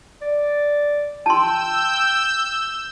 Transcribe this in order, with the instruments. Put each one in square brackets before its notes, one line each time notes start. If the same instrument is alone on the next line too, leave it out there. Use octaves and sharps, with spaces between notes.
[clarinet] D5
[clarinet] G5 [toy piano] A5 C6 [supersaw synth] E6 G6